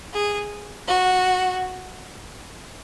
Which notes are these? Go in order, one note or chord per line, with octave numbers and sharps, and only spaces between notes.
G#4
F#4